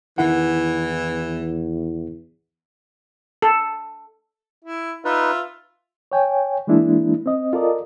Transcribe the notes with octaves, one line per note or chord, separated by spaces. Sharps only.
E2 D#3 E3 E4 F#5
A4
E4
D#4 F4 B4 E5
C#5 G5 G#5
E3 G#3 A#3 D4 E4
C4 D#5
F4 A4 A#4 D5 D#5